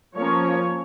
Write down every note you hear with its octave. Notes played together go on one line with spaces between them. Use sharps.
F3 A#3 C#4 C#5